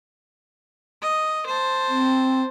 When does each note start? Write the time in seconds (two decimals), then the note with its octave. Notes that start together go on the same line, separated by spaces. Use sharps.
1.02 D#5
1.46 C5 A5
1.88 C4